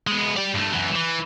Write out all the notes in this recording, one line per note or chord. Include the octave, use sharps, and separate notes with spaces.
G#3 B3
G4 D5
G2 A3
F#2 E3
E3